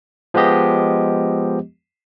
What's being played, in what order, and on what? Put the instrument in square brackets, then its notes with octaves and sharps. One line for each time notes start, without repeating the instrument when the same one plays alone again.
[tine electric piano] F3 G#3 B3 G4 D#5